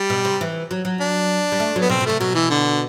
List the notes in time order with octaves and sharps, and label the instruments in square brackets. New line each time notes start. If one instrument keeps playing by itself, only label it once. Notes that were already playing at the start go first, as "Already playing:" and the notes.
Already playing: [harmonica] G3
[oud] B2
C3
E3
F#3
F#3
[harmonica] D4
[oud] G3
A3
F#3
[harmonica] B3
[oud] B2 [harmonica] C4
[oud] B2
[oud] C3 [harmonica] A3
[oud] B2 [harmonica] F#3
[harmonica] E3
D3